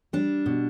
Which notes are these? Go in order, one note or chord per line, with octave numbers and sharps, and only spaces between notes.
G3 D4
B2